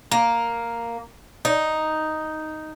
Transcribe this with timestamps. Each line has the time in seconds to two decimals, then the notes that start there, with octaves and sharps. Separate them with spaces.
0.11 A#3
1.45 D#4